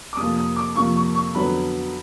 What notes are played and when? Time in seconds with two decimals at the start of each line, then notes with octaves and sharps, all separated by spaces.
0.13 D6
0.17 F2 C3 F3 A#3 D#6
0.36 D#6
0.56 D6
0.76 F2 C3 F3 A#3 C#6
0.96 C#6
1.15 C#6
1.35 F2 D3 F#3 B3 B5